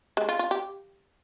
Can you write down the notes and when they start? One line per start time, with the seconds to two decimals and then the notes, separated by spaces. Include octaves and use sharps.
0.17 G#3
0.29 F4
0.39 F4
0.51 G4